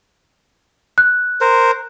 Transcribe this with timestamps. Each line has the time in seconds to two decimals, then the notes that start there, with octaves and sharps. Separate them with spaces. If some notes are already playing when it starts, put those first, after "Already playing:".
0.98 F#6
1.41 A#4 C5